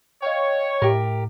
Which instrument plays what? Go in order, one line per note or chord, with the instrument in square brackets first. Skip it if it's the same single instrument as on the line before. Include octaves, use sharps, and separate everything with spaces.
[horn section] C#5 [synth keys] D#5 F5 G5
[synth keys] A2 [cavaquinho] G4 A#4